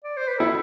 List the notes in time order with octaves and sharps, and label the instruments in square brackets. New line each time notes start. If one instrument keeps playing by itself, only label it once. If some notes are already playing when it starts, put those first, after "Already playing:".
[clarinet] D5
C5
B4
[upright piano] E4 [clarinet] A4